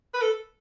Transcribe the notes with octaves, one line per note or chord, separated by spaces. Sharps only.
B4
A4